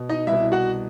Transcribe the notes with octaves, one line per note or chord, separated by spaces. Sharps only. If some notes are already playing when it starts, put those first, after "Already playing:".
Already playing: B2
D#4 D#5
C2 B2 E4 E5
F#4 F#5